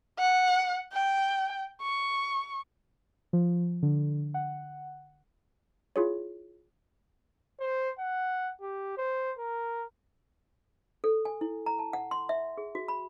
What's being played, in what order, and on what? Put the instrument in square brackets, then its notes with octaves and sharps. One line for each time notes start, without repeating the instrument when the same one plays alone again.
[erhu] F#5
G5
C#6
[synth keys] F3
D3
F#5
[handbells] E4 F4 G#4 C#5
[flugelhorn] C5
F#5
G4
C5
A#4
[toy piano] A4
G#5
E4
A#5
A5
F#5
C6
E5
G#4
F#4
B5